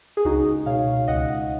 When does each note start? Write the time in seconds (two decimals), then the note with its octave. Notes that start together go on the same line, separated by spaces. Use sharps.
0.17 G#4
0.25 C#2 D#4 F#4
0.66 B2 C#5 F5
1.08 C#2 D#5 F#5